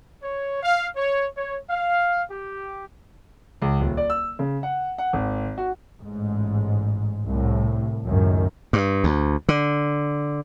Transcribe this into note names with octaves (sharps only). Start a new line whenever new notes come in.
C#5
F5
C#5
C#5
F5
G4
C#2
D#1
D5
E6
C#3
F#5
F#5
G#1
F#4
A1 G#2
C2 A2
C#2 F#2 A2 D#3
G2
D2
D3